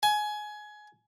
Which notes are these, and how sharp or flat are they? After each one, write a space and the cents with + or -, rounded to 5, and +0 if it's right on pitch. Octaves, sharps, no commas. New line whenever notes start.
G#5 +20